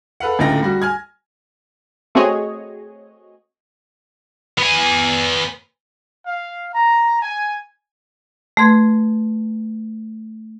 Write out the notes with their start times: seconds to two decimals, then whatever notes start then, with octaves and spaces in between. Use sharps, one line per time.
0.20 A4 B4 F5 F#5
0.39 D1 C#2 A3 F4 G5 A#6
0.63 G3 F#4
0.82 G#5 F6 G#6
2.15 A3 C4 F#4 G#4 C#5 D#5
4.58 B3 G#5
6.24 F5
6.73 A#5
7.20 G#5
8.57 A3 B4 C6 G#6